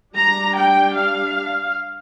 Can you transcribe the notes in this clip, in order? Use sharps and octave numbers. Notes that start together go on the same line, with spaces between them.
G3 D4 A#5
G5
F5